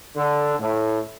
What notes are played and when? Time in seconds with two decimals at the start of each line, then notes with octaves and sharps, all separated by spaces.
0.16 D3
0.59 A2